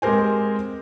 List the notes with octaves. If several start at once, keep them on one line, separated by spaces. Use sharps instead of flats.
G#3 C4 G4 A#4 C5 G#5